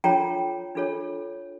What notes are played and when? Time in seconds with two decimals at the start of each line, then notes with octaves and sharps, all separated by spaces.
0.04 D4 F4 A4 C#5 G5 A#5
0.75 D4 F4 A4 C#5